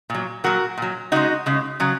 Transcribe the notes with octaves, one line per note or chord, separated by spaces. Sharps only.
A#2 F#3
A#2 F#3 F#4 A#4
A#2 F#3
C#3 G#3 D#4 F#4
C#3 G#3
C#3 F#3